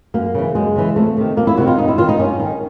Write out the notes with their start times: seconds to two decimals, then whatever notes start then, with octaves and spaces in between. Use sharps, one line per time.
0.14 F#2 A#3
0.34 C#3 E3
0.55 F#2 G#3
0.76 C#3 E3
0.96 F2 A3
1.17 C3 D#3
1.37 F2 A#3
1.47 E4
1.57 C3 D#3 F#4
1.67 F4
1.77 G2 D#4
1.88 E4
1.98 D#3 F4
2.09 D#4
2.19 G2 C#4
2.40 D#3